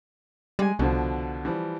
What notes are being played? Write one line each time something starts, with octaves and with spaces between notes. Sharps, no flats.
G3 G#3 G#5
C2 B2 D3 F3
E3 F3 G3